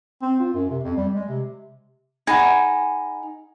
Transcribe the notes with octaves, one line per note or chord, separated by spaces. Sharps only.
C4
F4
F#2
C3
F2
G3
G#3
C3
D#4 G#4 F#5 B5 G#6